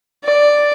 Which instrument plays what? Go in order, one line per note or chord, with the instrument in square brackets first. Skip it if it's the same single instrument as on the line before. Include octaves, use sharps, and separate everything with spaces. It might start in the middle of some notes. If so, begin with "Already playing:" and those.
[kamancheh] D5